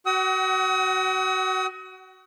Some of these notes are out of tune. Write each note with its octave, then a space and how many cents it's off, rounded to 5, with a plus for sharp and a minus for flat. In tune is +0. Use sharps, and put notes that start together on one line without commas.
F#4 +20 F#5 +40 D#6 +45